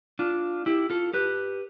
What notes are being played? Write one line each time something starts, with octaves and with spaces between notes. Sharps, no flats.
D4 F4
E4 G4
F4 A4
G4 B4